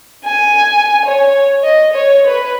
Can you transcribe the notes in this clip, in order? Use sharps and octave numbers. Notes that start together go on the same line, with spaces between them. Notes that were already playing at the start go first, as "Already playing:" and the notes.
G#5
C#5
D#5
C#5
B4